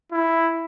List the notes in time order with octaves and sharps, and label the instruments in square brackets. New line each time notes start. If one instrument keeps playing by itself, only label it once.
[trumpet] E4